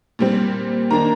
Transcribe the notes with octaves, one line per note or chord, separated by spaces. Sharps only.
A#2 G3 C4
D#3 A#3 D4 A#5